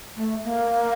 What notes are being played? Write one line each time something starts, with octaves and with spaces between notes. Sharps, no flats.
A3
A#3